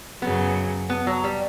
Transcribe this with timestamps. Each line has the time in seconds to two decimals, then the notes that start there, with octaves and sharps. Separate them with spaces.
0.22 F#2 C#3 F#3 B3
0.90 B3
1.07 F#3
1.24 G3